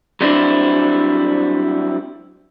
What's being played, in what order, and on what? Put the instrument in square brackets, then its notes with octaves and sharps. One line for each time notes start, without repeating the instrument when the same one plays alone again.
[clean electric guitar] F#3 G3 C4 D4 E4 C5